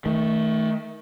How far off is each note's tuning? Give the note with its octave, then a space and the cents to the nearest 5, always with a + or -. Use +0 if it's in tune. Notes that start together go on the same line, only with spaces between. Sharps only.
D#3 +30 A3 +0